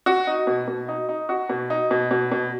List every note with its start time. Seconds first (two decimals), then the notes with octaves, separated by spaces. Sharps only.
0.06 F#4
0.27 D#4
0.47 B2
0.68 B2
0.88 D#4
1.09 D#4
1.29 F#4
1.49 B2
1.70 D#4
1.91 B2
2.11 B2
2.32 B2